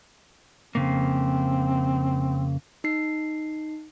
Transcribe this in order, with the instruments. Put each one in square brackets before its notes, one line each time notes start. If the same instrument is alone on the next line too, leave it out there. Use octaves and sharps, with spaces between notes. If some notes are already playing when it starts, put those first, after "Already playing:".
[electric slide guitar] F2 C#3 A#3 [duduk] C4
[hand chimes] D#4 C7